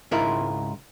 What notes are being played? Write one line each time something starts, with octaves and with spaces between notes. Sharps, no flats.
C#2 G#2 E4 F4 A#4